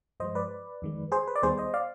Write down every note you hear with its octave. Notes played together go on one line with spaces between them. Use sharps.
G2 F3 G#3 C5 D#5
B4 D5
F2 D#3 G#3
G#4 C5
B4
D5
D#2 D#3 G3 B3 G#4 C5
C5 D#5
D5 F5